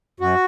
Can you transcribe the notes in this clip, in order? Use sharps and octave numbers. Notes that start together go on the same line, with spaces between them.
F#2 F#4